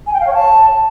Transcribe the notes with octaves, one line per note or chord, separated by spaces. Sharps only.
G#5
G5
F5
C#5
A5